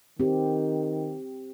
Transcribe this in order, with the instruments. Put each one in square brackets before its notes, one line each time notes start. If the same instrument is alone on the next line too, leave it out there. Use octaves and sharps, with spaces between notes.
[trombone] D#3 [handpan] C4 G4